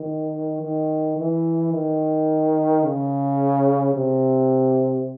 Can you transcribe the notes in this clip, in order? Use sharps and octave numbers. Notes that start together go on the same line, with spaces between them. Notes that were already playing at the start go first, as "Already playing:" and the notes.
Already playing: D#3
D#3
E3
D#3
C#3
C3